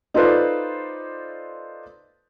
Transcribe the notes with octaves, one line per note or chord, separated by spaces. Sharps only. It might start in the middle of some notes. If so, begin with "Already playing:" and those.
D#4 F4 A4 B4 C5 D5